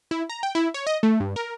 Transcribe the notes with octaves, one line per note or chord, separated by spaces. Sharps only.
E4
A#5
G5
E4
C#5
D#5
A3
G2
A#4